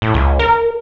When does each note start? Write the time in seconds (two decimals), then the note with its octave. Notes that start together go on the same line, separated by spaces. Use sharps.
0.02 A2
0.14 C#2
0.39 A#4